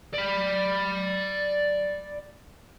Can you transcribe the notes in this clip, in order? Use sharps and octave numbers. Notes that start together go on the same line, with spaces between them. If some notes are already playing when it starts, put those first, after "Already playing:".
D5 B5